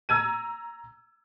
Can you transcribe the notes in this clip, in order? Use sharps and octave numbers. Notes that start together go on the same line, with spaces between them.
A#5 E6 G#6 D#7